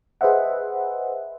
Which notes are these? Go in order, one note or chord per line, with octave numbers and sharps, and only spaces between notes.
G#4 B4 C5 D#5 E5 F#5